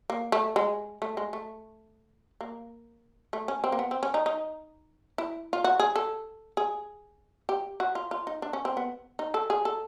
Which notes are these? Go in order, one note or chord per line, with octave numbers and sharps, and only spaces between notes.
A#3
A3
G#3
A3
G#3
A3
A#3
A3
C#4
C4
A#3
B3
C4
C#4
D#4
D#4
E4
F4
F#4
G#4
A4
G#4
G4
F#4
F4
F4
D#4
D4
C#4
C4
B3
D#4
A4
G#4
A4